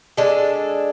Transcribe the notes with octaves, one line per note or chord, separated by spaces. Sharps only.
G#3 D4 A4